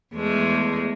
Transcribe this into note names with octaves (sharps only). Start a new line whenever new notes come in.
E2 G#3 A3